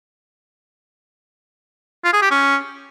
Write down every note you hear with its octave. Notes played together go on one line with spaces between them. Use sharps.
F4
G#4
G4
C#4